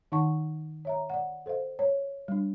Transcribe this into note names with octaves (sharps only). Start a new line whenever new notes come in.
D#3 D#4 F#5 A5 C#6
C#5 E5 A#5
D5 F#5
A4 C5 D#5 F5
C#5
G3 D4